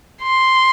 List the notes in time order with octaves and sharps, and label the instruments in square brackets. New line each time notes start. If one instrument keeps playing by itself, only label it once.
[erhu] C6